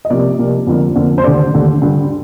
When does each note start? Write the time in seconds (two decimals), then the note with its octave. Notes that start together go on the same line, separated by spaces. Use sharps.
0.05 D#5
0.10 C2 C3 F3 A#3 D5
0.39 C2 C3 F3 A#3
0.67 F2 D3 F3 A#3
0.95 F2 D3 F3 A#3
1.18 C5
1.24 A3 D5
1.27 D#2 D3
1.54 D#2 D3 A3
1.82 G2 D3 G3